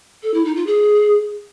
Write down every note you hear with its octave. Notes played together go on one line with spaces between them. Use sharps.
A4
E4
D#4
F4
G#4